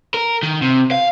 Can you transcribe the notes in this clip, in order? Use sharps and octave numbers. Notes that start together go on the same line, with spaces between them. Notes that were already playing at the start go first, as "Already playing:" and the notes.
A#4
D#3
C3
F5